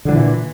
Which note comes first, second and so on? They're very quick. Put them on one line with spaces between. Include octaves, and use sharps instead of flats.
D3 F#3 E3 A#2